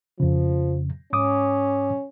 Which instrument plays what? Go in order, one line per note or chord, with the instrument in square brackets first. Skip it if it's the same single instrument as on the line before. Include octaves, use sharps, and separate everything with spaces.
[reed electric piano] F2 C#3 [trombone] F3
[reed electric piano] G#2 D6 D#6 [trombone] C#4